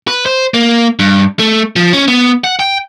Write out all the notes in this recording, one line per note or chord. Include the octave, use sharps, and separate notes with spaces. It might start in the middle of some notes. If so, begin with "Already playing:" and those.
B4
C5
A#3
G2
A3
F3
C#4
B3
F#5
G5